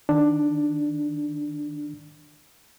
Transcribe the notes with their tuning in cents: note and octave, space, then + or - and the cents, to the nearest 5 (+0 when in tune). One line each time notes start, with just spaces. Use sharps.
D#3 +0 D4 +5